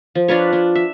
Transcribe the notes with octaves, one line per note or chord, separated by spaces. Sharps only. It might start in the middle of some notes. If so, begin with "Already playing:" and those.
F3
D4 F4 B4 C#5
D4
E5